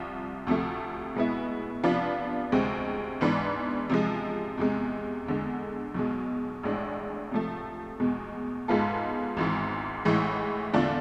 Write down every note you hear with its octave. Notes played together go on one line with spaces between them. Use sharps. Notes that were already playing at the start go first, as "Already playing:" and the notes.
Already playing: C2 C3 F3
D2 C3 F3 A3
B2 G#3 B3 E4
C3 F3 B3 D4 F4
D2 C3 G#3 C4
G#2 E3 B3 D4
C3 F3 G#3
E2 C3 G#3
E2 D3 G#3
B1 B2 G#3
A1 A2 G#3 D4
C3 F3 A3
E2 B2 G#3
G#2 G#3 B3 F4 A4
G#1 G#2 E3
A1 A2 E3 G#3
E2 D3 A3 D4 F4